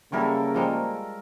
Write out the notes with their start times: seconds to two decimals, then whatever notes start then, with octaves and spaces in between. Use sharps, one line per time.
0.12 C#3 F#3 G3 A#3 E4 A4 A#4 C#6
0.55 F3 G3 G#3